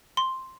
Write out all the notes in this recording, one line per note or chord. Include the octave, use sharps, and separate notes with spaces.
C6